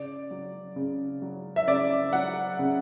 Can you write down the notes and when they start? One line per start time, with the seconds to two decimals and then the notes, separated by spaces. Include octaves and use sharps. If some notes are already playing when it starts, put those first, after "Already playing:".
Already playing: C#3 D5
0.31 F#3
0.76 C#3
1.22 F#3
1.56 E5
1.67 C#3 D5
2.13 F#3 F#5
2.59 C#3